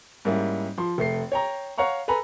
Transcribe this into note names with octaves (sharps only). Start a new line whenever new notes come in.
G#2 G3 A#3 C#4 E4
F3 C6
F1 A3 C7
C#5 G5 A#5
C#5 F5 F#5 A#5 C#6
A4 B4 G#5 A#5 B5